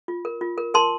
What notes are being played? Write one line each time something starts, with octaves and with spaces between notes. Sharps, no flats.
F4
A#4
F4
A#4
A#4 A5 C6